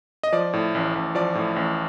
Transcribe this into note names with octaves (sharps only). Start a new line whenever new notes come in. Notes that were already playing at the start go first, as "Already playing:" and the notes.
D#5
F3 D5
A2
A1
A1
F3 D5
A2
A1